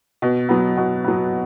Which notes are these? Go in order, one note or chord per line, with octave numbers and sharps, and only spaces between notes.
B2
F#3 B3
B2
F#3 B3